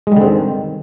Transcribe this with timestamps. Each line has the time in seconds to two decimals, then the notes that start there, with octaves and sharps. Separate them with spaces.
0.07 G#3
0.12 G3
0.17 D3
0.21 C4
0.26 D#3